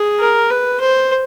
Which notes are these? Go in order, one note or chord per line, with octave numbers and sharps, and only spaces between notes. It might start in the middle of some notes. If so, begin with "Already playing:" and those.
Already playing: G#4
A#4
B4
C5